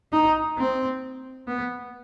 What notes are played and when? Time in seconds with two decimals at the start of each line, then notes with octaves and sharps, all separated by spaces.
0.12 D#4
0.57 C4
1.47 B3